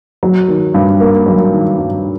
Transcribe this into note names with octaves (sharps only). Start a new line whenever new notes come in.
F#3
D#3
G2
A#3
F#3
D#3
G2